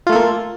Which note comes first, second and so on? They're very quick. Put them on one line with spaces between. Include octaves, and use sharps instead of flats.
F4 A3 A4 A#3